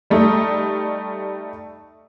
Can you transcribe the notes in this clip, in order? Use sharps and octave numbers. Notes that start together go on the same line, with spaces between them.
G3 A3 D#4